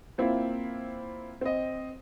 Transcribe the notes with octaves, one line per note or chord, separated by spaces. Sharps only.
A#3 C4 E4 F4
C4 D#5